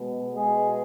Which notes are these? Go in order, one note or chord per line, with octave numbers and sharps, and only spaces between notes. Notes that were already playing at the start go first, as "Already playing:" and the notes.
Already playing: B2 G#3 B3
G#3 G#4